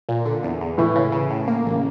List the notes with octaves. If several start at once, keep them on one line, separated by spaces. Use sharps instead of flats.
A#2
D3
E2
E2
A2 E3
C#3
C#3
A2
A#3
A1
C#3